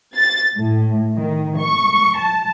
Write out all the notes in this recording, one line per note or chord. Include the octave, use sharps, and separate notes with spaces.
A6
A2
D#3
C#6
A5